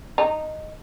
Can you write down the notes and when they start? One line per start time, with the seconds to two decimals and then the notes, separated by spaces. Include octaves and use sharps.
0.18 D#4